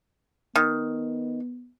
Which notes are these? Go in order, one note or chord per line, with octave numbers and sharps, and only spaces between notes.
D#3 B3